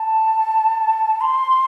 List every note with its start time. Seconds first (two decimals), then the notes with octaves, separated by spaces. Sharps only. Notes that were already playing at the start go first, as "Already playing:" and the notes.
Already playing: A5
1.21 C6